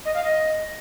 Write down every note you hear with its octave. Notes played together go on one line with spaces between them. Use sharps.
D#5
F5
D#5